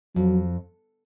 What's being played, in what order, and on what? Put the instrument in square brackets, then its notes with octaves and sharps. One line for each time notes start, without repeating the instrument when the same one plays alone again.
[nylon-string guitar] F2 [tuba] F#3